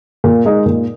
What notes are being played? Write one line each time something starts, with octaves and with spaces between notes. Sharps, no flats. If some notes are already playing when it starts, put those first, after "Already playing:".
A#2
G#3 D#4
A#2